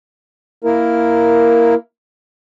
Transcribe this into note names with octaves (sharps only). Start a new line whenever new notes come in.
A#3 E4 A#4